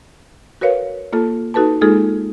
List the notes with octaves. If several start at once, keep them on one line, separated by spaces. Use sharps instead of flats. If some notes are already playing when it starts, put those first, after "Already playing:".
F#4 A#4 B4 C#5 F5
A#3 F4 A4 A5
D#4 F#4 A4 B4 A5
G#3 A#3 D#4 F4 G#4 A4